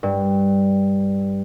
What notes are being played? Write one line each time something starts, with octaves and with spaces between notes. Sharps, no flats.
G2